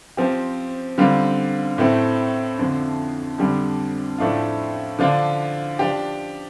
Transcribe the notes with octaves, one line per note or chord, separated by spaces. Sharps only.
F3 C4 G4
D3 G3 C4 F4
A2 A3 C4
F2 D3 F3
F2 D3 G3 D4 G4
A2 F3 A3 D4 F4
D3 F3 D4 F4
F3 D4 G4